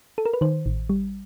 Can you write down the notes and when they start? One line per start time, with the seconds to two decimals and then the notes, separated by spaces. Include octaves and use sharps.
0.18 A4
0.26 A#4
0.34 B4
0.41 D#3 C5
0.66 A1
0.89 G3